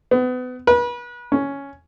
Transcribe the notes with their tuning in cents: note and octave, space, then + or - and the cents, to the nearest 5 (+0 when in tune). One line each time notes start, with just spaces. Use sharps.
B3 +30
B4 -35
C#4 +5